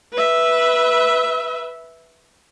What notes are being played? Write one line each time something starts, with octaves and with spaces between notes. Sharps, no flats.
B4 E5